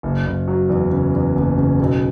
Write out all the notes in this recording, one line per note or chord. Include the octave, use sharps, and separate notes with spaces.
F#1
F#1
F#3
E2
C#3
E2
F#1
C#3
B1